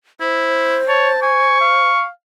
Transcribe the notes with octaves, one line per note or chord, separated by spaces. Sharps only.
E4 C5
C#5 A5
G#5 C#6
F5